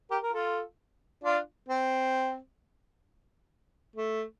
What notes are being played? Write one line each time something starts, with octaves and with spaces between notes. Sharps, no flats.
G4 A#4
A#4
F4 A4
D4 F4
C4
A3